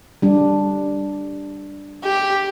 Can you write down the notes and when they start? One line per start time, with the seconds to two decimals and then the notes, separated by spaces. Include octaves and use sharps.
0.22 G3 D4
2.04 G4